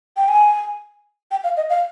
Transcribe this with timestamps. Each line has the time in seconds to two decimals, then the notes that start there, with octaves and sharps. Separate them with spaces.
0.17 G5
0.28 G#5
1.31 G5
1.44 F5
1.57 D#5
1.70 F5